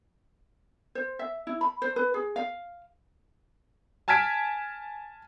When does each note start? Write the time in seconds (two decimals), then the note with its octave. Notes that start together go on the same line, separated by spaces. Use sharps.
0.95 C5
1.19 E5
1.47 E4
1.61 B5
1.82 C5
1.96 B4
2.14 G#4
2.36 F5
4.08 G#5 A5 F6 G#6 B6 D7